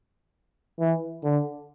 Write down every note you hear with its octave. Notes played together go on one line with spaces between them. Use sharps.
E3
D3